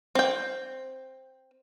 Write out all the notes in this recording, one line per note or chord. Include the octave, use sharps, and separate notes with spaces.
C4 G5